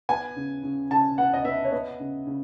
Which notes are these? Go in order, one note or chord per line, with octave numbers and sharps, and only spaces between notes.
B3 G#5
C#3
C#3
C#3 A5
B3 F#5
D#5
B3 E5
C#5
B3 D#5
C#3
C#3